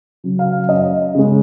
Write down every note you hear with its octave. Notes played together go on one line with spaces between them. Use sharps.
C#3 F#3
F5
F#2 D#5
C#3 G#3